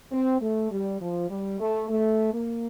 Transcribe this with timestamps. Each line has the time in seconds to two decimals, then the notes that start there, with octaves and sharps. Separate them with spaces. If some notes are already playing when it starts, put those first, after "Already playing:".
0.12 C4
0.41 A3
0.71 G3
1.01 F3
1.30 G3
1.60 A3
1.89 A3
2.34 A#3